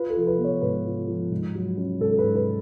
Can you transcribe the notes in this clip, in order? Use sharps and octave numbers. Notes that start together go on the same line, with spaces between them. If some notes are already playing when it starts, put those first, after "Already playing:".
Already playing: F4 B4
A4
F3
B4
B3
C#5
G#2 B4
F4
F3
G#2
F#3
C#4
G#2 A4
G#2 B4
B4